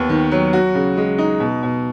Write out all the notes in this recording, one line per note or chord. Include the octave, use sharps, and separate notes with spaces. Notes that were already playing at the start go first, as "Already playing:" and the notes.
Already playing: D#2 B3
D#3
F#3
F#4
C#3
G#3
D#4
B2
B2